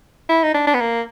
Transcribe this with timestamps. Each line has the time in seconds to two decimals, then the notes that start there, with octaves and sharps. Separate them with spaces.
0.29 E4
0.43 D#4
0.54 D4
0.67 D4
0.74 B3
0.80 A#3